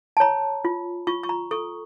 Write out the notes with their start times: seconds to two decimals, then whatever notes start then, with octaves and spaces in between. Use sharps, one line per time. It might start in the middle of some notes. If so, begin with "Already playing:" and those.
0.17 A5
0.20 C#5 A#5
0.65 F4
1.07 F4 C#6
1.23 C#6
1.29 A#5
1.51 A4 C#6